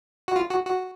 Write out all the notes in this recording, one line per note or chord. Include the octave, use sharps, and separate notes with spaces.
F#4
F4
F#4
F#4